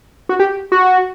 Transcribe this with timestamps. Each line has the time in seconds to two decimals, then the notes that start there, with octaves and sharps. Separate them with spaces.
0.29 F#4
0.40 G4
0.72 F#4